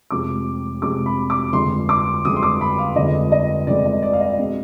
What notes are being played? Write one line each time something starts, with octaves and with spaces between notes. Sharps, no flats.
F1 F2 C3 F3 G#3 D6
F1 F2 C3 F3 G#3 D6
B5
D6
G1 F2 D3 G#3 C6
D6
G1 F2 D3 G#3 D#6
C6
D6
B5
F5
G1 F2 D3 G#3 D#5
D#5
G1 F2 D3 G#3 D5
D#5
D5
F5
D#5
B2 G#3 C4